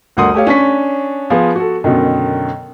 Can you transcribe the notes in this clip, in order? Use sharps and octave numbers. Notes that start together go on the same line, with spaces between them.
G1 D2 A#4 F#5 C6 D#6
A3 G4 C#5 F5
C#4 D4 C#6 B6
F3 B3 F4 G#4
F#4 A4
F#2 B2 D3 D#3